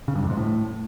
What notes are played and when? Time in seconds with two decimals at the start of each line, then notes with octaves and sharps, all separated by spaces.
0.08 C#3
0.15 G2
0.22 F2
0.30 G#2
0.37 A2